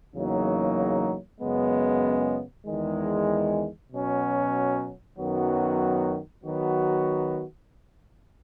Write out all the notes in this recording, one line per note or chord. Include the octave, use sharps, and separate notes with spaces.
E2 C#3 F#3 A#3 D#4
F#2 C#3 G#3 B3
E2 D#3 G#3
B2 F#3 C#4
F#2 D#3 F#3 B3 F#4
D#3 F#3 B3 F#4